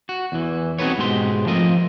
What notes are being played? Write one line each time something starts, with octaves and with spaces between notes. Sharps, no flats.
F#4
E2 E3
C4 D#4 F#4 A4 B4 C#5
G#2 B2 G#3 G4 C6
F3 A3 C4 F4 A#4 D#5